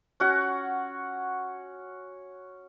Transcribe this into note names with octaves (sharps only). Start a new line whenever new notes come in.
C#4 F#4 F#5